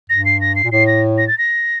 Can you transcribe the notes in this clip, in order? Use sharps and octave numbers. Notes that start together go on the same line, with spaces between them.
G2 A#6
C7
A#6
C7
A#2
A2 C7
A#6
A#6
A6
A#6